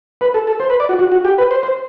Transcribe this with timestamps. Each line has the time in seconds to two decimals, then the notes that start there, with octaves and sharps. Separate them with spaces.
0.21 B4
0.34 A4
0.47 A4
0.60 C5
0.70 B4
0.80 D5
0.89 F#4
0.99 F#4
1.12 F#4
1.25 G4
1.38 B4
1.51 C5
1.63 C5